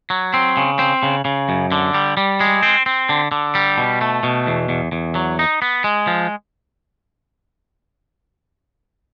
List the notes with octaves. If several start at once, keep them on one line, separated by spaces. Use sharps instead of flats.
F#3
C4
C#3
C4
C#3
C#3
F#2
D3
G3
G3
G#3
C4
C4
D3
D3
G3
B2
A3
B2
E2
E2
E2
F#3
D#4
B3
G#3
F3